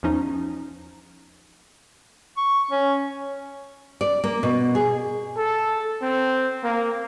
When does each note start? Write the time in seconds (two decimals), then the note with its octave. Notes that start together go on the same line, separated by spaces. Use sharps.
0.03 E2 F3 C#4 D#4
2.37 C#6
2.71 C#4
4.01 D5
4.24 A#3
4.43 B2
4.75 G#4
5.37 A4
6.02 C4
6.63 A#3